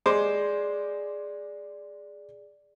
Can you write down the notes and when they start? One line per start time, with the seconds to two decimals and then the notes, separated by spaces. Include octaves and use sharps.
0.06 G#3 G#4 C5 D5 D6